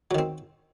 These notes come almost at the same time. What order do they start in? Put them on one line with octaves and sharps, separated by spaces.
F#3 D#3 C4